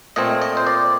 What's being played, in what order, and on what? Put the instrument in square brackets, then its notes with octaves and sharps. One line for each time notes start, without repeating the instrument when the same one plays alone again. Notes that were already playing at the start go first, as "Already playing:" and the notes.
[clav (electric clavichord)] A#2 A3 C4 D#5
D#5
C5
D5